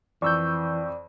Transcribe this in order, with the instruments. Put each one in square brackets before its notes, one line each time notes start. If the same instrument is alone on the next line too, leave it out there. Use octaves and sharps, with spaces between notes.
[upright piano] F2 [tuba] E3 [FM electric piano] D5 [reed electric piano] C#6 E6 G6